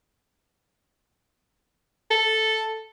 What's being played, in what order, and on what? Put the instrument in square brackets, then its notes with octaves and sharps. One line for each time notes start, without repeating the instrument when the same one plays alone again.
[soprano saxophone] A4